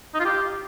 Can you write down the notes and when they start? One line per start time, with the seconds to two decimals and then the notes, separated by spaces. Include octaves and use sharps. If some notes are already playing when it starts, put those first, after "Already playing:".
0.14 D#4
0.20 F4
0.25 G4